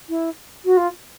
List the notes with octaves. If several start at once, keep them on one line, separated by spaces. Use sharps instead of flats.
E4
F#4
F4